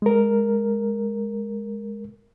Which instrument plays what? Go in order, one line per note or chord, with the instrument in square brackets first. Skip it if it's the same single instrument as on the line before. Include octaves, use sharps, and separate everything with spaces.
[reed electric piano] G#3 A#4